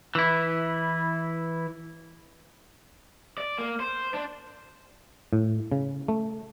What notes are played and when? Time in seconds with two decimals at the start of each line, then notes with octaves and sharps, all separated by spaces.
0.15 E3 E4
3.38 D5
3.58 A#3
3.80 C5
4.14 D4
5.33 A2
5.72 C#3
6.08 A3